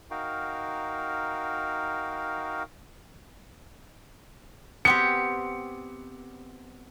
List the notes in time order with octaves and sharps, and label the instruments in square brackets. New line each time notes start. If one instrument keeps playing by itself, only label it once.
[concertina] D#4 F#4 A#4 F5 G5
[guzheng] B3 C4 G4 [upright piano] C#7